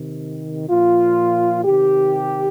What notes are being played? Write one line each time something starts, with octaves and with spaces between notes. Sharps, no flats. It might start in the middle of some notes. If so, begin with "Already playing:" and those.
Already playing: C3 D#3
A#2 F3 F4
C3 D#3 G4